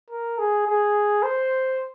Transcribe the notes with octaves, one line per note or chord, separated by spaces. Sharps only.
A#4
G#4
G#4
C5